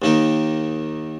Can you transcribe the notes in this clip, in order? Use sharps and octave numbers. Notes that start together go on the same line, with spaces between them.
D#2 D#3 A#3 D#4 A#4